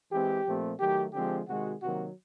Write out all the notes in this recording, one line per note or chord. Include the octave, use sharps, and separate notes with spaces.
E3 G#3 C4 G4
A#2 F3 A3 C4
D#3 F#3 A3 G4
D3 F3 G#3 C4 G4
C3 D#3 G#3 F#4
C3 D#3 F#3 A#3 F#4